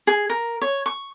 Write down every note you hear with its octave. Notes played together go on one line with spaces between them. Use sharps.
G#4
A#4
C#5
C#6